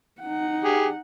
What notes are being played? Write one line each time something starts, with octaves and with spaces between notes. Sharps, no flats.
D#4 F#5
G4 G#4